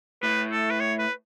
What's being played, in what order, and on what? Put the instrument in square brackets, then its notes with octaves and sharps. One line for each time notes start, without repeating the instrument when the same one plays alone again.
[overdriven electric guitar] A2 [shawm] B4
[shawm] A4
B4
C#5
B4